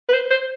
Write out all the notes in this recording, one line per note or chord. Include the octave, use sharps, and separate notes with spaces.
B4
C5
C5